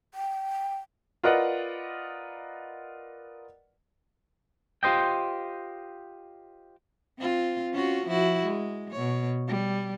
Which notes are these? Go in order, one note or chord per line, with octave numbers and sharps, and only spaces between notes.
G5
F4 A#4 B4 D5 D#5 F#5
F4 G4 C5 D#5 G5
C4 F4
C#4 F4 F#4
F3 E4 F#4
G#3
B2 C#5
G3